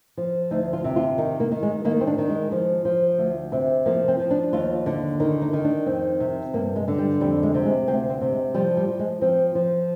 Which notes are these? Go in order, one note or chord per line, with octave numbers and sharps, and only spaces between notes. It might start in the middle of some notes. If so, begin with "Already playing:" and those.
F3
D2 D#4
F4
C3
F4
D#3 D#4
A#3
D#3
G#3
D#3 A#3
C4
D4
D#3
G#3
F3
F3
D2
C3
F3 A#3
C4
F3
D4
D#2 F4
D3
D#3 D#4
D#4
D#3
D4
F2 C4
C3
G2 A#3
G#3
D3
G3
F2 G3
G#3
C3
G#3
D2 C4
C4
C3
G#3
F3 G3
G3
F3
G#3
F3 C4
F3